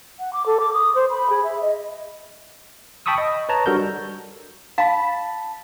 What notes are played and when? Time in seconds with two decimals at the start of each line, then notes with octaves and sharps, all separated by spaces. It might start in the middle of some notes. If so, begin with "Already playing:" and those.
0.19 F#5
0.33 D6
0.46 A4
0.60 D6
0.74 D#6
0.95 C5
1.10 B5
1.30 G#4
1.43 E5
1.62 D#5
3.06 G5 A5 B5 C#6 D#6 E6
3.18 D#5
3.49 B4 C#5 A5 A#5
3.66 G3 D4 F#4 A4 A#4 G6
4.78 F5 A5 B5